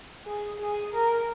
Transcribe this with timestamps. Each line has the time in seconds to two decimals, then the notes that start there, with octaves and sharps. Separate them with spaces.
0.26 G#4
0.59 G#4
0.93 A#4